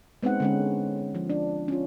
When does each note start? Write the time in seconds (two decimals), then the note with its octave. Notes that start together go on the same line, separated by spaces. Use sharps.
0.23 G#3 B3 C4 D#4 F#5
0.40 D3 G#3 C#4
1.15 F3
1.30 D4
1.68 C#4 F4